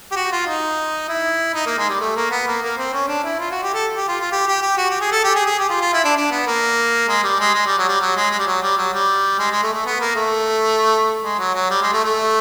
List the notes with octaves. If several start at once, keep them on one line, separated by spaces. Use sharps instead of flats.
G4
F#4
F4
D#4
E4
D#4
A#3
G#3
G3
A3
A#3
B3
A#3
A#3
C4
C#4
D4
E4
F4
F#4
G4
A4
G4
F4
F4
G4
G4
G4
F#4
G4
G#4
A4
G4
G#4
G#4
G4
F4
F4
E4
D4
D4
B3
A#3
G#3
G3
G#3
G#3
G3
F#3
G3
F#3
G#3
G#3
G3
F#3
G3
F#3
G3
G#3
G#3
A3
A3
B3
A#3
A3
G#3
F#3
F#3
G3
G#3
A3
A3